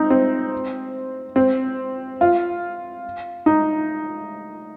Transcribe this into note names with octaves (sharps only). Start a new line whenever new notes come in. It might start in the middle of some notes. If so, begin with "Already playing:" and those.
Already playing: C4 D#4
C4
C4
F4
D#4